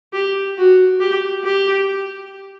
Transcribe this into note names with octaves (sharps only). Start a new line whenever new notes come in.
G4
F#4
G4
G4